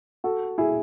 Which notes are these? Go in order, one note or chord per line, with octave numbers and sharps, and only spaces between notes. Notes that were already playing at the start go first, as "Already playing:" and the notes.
F#4 A4
E4 G#4